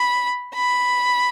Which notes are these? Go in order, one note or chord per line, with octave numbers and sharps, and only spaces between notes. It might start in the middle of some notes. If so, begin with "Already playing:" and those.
Already playing: B5
B5